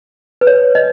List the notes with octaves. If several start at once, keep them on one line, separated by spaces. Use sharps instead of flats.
B4
C#5
D#5